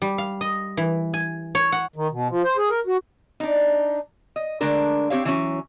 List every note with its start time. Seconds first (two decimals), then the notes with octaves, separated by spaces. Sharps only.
0.02 G3
0.18 F5
0.41 D#5
0.77 E3
1.14 G#5
1.55 C#5
1.72 F#5
1.96 D#3
2.11 B2
2.30 F3
2.44 C5
2.57 G#4
2.70 A#4
2.87 F#4
3.40 D4 D#4
4.36 D#5
4.61 D3 G#3 A3 D4 A#4
5.10 C4 G4 C#5 F5
5.25 E3 F#3 C#4